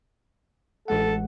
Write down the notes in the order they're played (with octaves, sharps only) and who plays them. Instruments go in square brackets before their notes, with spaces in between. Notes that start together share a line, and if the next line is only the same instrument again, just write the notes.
[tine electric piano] A1 G#3 F#5 [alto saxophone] A4